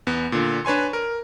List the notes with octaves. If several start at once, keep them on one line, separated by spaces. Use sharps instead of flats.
E2 B3
A#2 D3
D4 B4 C#5 G#5 C6
A#4